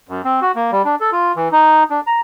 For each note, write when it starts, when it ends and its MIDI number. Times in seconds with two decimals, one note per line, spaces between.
0.09 0.21 42
0.25 0.40 60
0.41 0.52 66
0.55 0.71 58
0.72 0.82 55
0.85 0.95 62
1.00 1.10 69
1.12 1.32 65
1.36 1.48 52
1.52 1.83 63
1.90 2.01 62
2.07 2.21 82